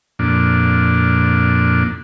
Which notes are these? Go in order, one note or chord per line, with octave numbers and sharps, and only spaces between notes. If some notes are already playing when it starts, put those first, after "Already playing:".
F2 A#2 D4